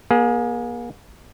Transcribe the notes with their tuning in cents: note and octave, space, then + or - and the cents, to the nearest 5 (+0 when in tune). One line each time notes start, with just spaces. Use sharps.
A#3 +40 G#4 +0